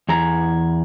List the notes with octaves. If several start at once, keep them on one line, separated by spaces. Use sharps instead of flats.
E2 G#4 A#5